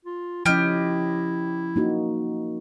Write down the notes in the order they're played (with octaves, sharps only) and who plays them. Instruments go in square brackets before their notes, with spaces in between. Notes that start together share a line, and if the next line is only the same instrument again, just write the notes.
[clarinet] F4
[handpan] F3 C#4 [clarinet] E4 [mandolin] G4 D#5 F6
[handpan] A#3 D#4 F#4